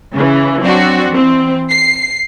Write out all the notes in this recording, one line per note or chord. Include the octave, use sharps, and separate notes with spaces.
C#3 E3
F#3 C4 D4 F#4
E3 C4
C7